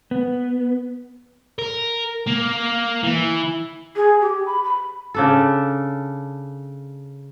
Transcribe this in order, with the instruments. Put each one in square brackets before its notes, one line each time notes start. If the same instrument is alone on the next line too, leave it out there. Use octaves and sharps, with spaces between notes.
[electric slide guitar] B3
[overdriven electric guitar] A#4
A#3
E3
[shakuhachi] G#4
G4
B5
B5
[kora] C#3 D4 A4